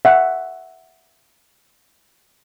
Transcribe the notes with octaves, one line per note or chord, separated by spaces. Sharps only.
E5 F#5